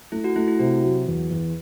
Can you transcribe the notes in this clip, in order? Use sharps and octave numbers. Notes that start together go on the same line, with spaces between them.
A3 E4
F#4
A3 E4
E4
C3 F#4
F#3
E2
E2